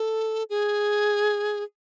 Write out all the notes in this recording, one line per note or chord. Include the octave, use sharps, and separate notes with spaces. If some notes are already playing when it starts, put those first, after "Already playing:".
Already playing: A4
G#4